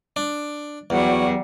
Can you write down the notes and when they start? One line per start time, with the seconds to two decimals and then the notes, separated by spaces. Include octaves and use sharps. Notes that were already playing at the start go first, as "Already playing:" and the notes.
0.16 D4
0.90 E2 F#3 G3 F#5